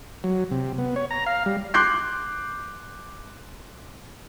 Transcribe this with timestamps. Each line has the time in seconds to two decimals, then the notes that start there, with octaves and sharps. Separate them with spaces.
0.24 F#3
0.51 C3
0.78 B3
0.96 C#5
1.11 A#5
1.26 F5
1.46 G3
1.74 C6 D6 F#6 G6 C7